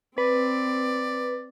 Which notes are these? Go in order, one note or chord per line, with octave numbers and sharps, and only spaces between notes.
C4 B4 D5